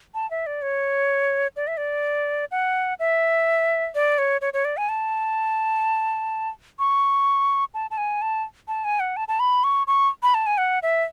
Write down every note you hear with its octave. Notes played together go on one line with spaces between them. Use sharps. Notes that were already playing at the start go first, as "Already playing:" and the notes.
A5
E5
D5
C#5
D5
E5
D5
F#5
E5
D5
C#5
C#5
C#5
D5
G#5
A5
C#6
A5
A5
G#5
A5
A5
G#5
F#5
A5
A5
B5
C#6
C#6
B5
A5
G#5
F#5
E5